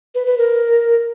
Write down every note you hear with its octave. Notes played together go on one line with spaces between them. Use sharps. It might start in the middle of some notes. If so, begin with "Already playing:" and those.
B4
B4
A#4